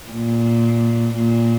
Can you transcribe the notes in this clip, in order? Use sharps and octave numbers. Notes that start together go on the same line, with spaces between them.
A#2
A#2